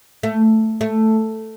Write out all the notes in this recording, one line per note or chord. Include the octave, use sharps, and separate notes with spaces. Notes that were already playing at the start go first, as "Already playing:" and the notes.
A3
A3